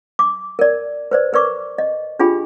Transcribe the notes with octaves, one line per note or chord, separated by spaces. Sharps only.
D6
A#4 D5
B4 C5 D5
A#4 B4 D5 C#6 D6
D#5
D4 F4 G4 G#4 G5 B5